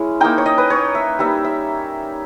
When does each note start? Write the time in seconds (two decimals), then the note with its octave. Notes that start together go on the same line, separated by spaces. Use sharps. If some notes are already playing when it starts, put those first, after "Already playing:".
Already playing: G#3 C#4 E4
0.21 A#3 D#4 G5
0.38 C#5
0.46 D#5
0.58 B4
0.70 C#5
0.95 E5
1.19 G3 A#3 D#4 E5
1.45 E5